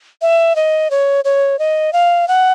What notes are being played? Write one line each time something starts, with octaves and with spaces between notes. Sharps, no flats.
E5
D#5
C#5
C#5
D#5
F5
F#5